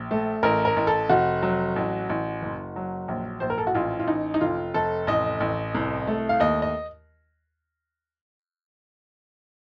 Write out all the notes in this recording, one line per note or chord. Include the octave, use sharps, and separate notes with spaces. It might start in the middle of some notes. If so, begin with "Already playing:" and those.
Already playing: A#1
A3
A1 A#4
A#4
A1
A4
F1 F#4
F#3
A1
A1
F#1
F#3
A#1
A#1 C5
A#4
A4
F#4
A1 F4
F4
A1 D#4
D#4
F1 F4
F1 A4
A1 D#5
A1
C2
A3
F5
D#2 D#5
D#5